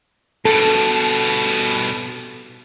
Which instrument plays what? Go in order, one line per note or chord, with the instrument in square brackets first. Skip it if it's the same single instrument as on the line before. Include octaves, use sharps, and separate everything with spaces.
[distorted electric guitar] G2 B2 [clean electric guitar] A4